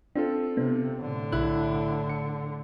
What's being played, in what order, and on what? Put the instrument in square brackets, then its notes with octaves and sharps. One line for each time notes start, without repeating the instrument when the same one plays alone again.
[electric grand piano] C4 F4 A4 [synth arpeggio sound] D4
[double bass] C3 [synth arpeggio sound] B3 D4
[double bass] A2 D3
[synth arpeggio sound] B1 E5 F#6 [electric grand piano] E4
[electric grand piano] C#7